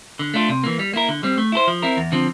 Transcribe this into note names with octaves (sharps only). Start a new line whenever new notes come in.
D3
A3 D4 F4
C3
E3 A#3
G3
A#3 E4 A#4
D3
G3 C4
A3
E4 A4 C5
F3
C4 E4 A#4
E2
D3 F3 C4